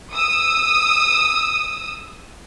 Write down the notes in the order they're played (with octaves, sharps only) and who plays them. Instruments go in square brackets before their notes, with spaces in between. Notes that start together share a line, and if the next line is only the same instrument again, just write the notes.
[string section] D#6 E6